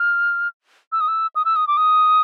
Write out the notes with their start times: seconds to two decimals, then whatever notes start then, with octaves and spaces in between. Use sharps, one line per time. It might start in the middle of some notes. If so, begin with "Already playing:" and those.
Already playing: F6
0.92 E6
1.01 D#6
1.08 E6
1.35 D#6
1.45 E6
1.56 D#6
1.67 D6
1.77 D#6